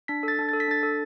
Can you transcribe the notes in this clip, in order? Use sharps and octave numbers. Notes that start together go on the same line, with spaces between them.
D4 B6
A4 A6
D4
A4 A6
B6
D4 A6
A4